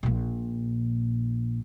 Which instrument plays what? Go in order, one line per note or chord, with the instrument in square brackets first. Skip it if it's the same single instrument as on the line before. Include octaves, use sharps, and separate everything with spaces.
[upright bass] A#1 A#2